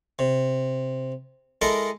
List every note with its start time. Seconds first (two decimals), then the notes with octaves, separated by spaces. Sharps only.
0.19 C3
1.62 G#3 E4 A4 A#4 D#5